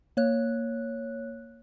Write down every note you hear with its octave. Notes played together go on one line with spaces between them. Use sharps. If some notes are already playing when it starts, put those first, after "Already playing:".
A#3 C#5 F#6